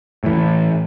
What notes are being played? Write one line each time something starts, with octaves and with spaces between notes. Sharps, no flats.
A2 E3